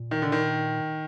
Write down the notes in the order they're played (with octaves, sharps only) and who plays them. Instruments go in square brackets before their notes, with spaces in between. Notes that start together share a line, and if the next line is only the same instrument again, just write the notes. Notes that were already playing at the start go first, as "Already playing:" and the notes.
Already playing: [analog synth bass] A#2
[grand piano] D#3
D3
D#3